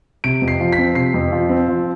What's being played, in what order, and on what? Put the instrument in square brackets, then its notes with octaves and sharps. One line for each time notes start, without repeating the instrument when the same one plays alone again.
[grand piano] C3 D7
F2
C7
F3
B6
C4
C3 C7
F2
F3
C4
F3